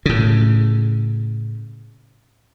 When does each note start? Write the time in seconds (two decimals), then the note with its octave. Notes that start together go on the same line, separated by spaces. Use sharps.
0.06 A2 C#3